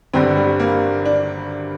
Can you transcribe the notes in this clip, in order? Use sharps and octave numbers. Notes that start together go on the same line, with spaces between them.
G1 G2 D3 C4
G3
A#3
D4